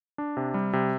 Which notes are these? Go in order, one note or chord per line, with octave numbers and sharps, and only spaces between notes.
D4
C3
G3
C3